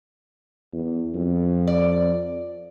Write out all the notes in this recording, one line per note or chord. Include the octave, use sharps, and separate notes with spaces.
E2
F2
D5